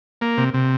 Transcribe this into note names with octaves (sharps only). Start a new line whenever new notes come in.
A#3
C3
C3